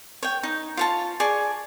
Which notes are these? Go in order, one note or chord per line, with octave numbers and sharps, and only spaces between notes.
C#5 G5
D#4
F4 C#5 A5
G#4 D5 C#6